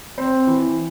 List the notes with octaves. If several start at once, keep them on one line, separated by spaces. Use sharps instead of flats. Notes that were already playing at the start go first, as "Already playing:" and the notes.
C4
E3